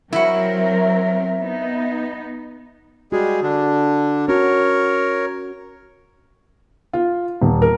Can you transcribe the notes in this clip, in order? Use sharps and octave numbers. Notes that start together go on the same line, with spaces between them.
F#3 C4 E4 F#4 A#4 E5
B3 D#4
G3 G#3 F#4 G#4
D3 D4
C#4 F#4 A#4 C#5
F4
D#1
A#4